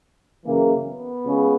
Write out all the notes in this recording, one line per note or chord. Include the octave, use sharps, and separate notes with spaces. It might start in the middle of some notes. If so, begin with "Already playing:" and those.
F#2 C#3 E3 A#3
B3
C#2 C#3